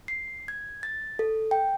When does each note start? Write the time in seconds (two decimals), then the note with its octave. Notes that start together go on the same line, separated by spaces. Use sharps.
0.08 C7
0.48 G#6
0.83 A6
1.19 A4
1.51 G5